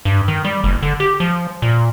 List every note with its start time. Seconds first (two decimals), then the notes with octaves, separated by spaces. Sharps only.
0.05 G2
0.28 D#3
0.45 G3
0.64 F#1
0.83 D3
1.00 G4
1.20 F3
1.62 A#2